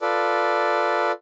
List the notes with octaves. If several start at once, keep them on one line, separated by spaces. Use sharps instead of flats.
F4 A4 B4 D5